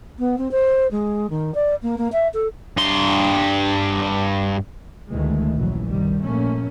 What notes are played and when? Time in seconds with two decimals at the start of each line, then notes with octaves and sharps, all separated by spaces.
0.19 B3
0.38 C4
0.52 C5
0.91 G#3
1.30 D#3
1.55 D5
1.82 A#3
1.98 A#3
2.12 E5
2.34 A4
2.77 G2 C6
5.11 D2 D#3 E3 G#3 A3
5.56 A#1 C#3 E3 F#3
5.86 C2 G2 D#3 G3
6.23 A#1 A3 A#3 C#4